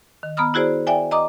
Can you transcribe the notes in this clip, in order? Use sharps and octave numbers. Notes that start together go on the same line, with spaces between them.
D#3
B3 A#5 B5 D#6 F6
E4 F#4 G#4 C5 D5
D5 E5 G5 G#5
D#5 A#5 D6 D#6